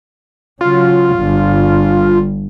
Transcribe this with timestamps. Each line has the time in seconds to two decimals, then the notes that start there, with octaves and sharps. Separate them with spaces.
0.61 C#3 F#3 F4
1.16 G1 G2